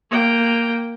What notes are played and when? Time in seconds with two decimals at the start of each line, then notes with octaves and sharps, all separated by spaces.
0.10 A#3 G5